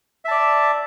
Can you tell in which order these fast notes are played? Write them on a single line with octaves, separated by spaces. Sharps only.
E5 A5 D5